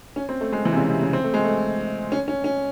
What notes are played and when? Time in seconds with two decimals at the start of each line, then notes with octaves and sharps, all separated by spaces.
0.16 C#4
0.29 C4
0.41 A3
0.53 G#3
0.65 E3
0.73 C3
0.77 C#3
0.90 C3
1.02 C#3
1.13 C4
1.24 A3
1.34 G#3
1.44 A3
2.12 C#4
2.28 C#4
2.44 C#4